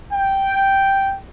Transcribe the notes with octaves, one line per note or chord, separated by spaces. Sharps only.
G5